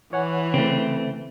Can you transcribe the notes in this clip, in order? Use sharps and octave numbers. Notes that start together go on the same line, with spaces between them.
E3 C#5 F#5 G#5
C#3 A3 C4